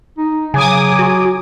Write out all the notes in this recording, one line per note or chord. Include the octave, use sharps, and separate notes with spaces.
D#4
C#3 F#3 G#5 D6 D#6
F#4